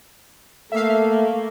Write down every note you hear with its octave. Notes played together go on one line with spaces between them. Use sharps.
A3 A#3 E5 F5